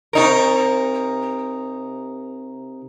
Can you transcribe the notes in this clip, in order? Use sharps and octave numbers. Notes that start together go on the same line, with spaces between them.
C3 D#4 A#4